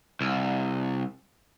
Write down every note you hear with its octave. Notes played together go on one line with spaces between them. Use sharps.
C2